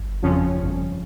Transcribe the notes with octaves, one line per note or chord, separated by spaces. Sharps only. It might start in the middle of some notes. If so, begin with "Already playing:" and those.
Already playing: G1
F2 C#3 F3 C#4
G1